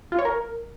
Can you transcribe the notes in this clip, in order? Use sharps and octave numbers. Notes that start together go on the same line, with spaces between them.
F4
C#5
A#4